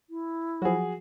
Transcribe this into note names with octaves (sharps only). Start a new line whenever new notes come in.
E4
F3 F#3 F#4 G#4